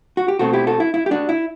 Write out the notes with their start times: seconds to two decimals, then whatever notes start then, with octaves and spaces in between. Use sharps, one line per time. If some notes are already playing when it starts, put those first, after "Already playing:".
0.17 F#4
0.28 G4
0.39 B2 A3 C4 F#4 A4
0.53 E4 G4
0.67 F#4 A4
0.80 E4
0.94 E4
1.06 G4
1.11 D4 F#4
1.29 E4